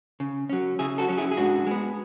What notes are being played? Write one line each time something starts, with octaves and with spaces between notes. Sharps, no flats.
C#3
F#3 C#4
C#3 E4 G#4
F#4 A4
F#3 C#4
E4 G#4
G#4
G#2 D4 F#4
G#3 B3